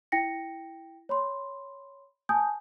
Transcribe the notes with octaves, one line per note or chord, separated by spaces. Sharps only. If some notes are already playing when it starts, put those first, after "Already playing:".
E4 G5 A#6 C#7
C#5 B5 C6
G#5 A5 D#6 G6